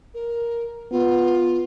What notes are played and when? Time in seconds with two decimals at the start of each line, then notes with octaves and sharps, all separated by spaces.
0.14 A#4
0.91 B3 F4